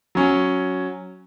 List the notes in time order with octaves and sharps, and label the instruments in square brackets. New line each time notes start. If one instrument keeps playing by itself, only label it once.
[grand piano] F#3 C#4